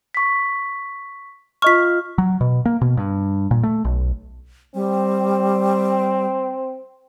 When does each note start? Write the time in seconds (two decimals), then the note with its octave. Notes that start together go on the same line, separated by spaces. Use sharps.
0.15 C#6 B6
1.62 F4 D#5 C#6 F6 B6
2.18 F#3
2.41 B2
2.65 A#3
2.81 B2
2.97 G2
3.51 A#2
3.63 A3
3.85 B1
4.74 G3 C4